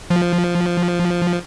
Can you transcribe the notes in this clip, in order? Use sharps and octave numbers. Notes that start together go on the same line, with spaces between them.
F3